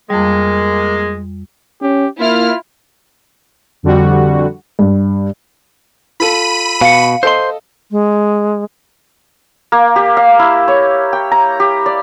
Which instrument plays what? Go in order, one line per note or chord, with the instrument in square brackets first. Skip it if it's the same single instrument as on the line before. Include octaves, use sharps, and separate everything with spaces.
[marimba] F2 G3 [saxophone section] G#3 A#3
[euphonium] C#4 [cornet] G4
[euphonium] A#3 [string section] E4 F6 [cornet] F4
[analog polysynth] F2 D3 G3 F#4
[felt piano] G2
[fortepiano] F4 A4 [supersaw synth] B5 D#7
[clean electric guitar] B2 [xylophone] F5 C#7
[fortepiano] A4 D#5 [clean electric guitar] C5 C6
[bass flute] G#3
[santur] A#3
G4
F5
E4
C#5
G5
A#5
G4
D5